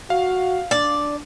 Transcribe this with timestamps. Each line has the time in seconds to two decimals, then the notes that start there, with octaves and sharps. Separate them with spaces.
0.10 F#4 F5
0.71 D4 D5